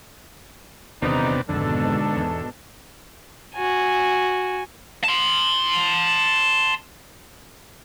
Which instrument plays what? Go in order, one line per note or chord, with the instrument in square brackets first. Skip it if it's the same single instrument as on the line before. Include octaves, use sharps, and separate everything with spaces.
[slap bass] D#1 E2 D#3 [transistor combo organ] C3 B3 D4 [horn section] D#4
[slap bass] G#1 F2 [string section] G#2 B2 [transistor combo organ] D3 [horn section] D4 D#4 A4
[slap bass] E2
[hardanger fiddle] F#4 G#5
[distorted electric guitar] A5 C6